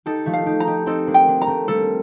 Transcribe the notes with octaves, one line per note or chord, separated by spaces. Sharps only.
D#4 G4 A4
F3 A3
F5
D#4 G4
A#5
D#4 G4
C4 D#4 A4
A#3 D4
G5
A#3 D4
A#5
A3 C4
G3 A#3 A4